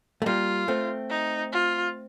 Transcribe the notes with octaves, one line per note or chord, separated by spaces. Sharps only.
A3
G3 A#3 F4
A3 C4
D#4
F4